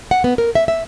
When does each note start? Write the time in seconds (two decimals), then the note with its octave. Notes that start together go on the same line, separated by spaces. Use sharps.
0.11 F#5
0.24 B3
0.38 A#4
0.55 E5
0.68 E5